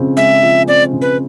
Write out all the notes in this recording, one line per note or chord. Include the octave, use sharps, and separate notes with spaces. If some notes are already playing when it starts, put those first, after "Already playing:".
Already playing: C#3 F3 G#3 C4
G#3 E5
F3
C4 D5
C#3
B4